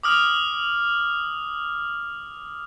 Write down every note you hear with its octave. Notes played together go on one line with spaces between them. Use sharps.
D6 D#6 F6